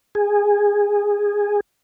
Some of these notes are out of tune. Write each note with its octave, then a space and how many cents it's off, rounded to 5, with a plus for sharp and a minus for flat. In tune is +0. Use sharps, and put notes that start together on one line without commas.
G#4 -15